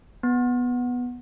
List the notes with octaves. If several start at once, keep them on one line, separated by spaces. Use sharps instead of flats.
B3